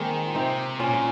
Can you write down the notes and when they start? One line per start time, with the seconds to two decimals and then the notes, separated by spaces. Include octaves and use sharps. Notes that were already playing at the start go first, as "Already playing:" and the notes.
Already playing: D#3 G#3 A#3 C4
0.27 F4
0.35 C3 C4 D#4
0.80 A#2 C#4 F4
0.94 F4